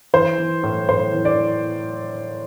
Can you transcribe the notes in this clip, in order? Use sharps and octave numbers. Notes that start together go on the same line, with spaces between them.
E3 C5
E3
A2
A2 C5
E3
D5